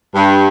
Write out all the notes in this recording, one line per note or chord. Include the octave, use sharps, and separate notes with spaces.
G2